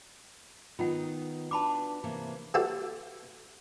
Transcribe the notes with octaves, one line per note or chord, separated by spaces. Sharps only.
D#3 B3 D#4 F4 F#5
D4 F#4 B4 A5 B5 D6
C3 E3 A#3
E3 F#4 G4 A4 C5